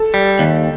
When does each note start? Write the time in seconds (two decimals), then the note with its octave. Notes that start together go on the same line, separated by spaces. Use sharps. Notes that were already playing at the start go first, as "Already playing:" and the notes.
Already playing: A4
0.14 G3
0.39 D#2